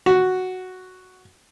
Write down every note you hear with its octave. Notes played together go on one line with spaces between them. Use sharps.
F#4